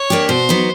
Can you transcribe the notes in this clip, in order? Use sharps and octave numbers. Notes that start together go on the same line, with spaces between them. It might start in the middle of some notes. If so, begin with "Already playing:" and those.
Already playing: C#5
A#3 D4 G4
B2 C5
F#3 B3 D#4